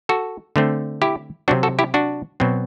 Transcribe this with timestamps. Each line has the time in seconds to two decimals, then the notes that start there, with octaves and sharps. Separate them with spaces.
0.09 F#4 A4
0.56 D3 A3 C4
1.02 E4 G4
1.48 C3 F#3 C4 D4 F#4
1.63 F#4 A4
1.79 E4 G4
1.94 D4 F#4
2.40 B2 F#3 C4